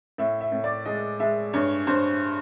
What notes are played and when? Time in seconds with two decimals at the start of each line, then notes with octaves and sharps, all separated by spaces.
0.18 A2 E5
0.41 E5
0.52 A2
0.64 D5
0.85 G#3 D#5
1.20 G#3 E5
1.53 G2 C#5
1.87 G2 C5